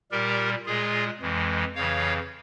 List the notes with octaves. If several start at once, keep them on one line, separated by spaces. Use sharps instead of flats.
A#2 G3 G4 A#4
A#2 G#3 F4 G#4
F2 E3 G#3
F2 C#3 E3 C#5 F5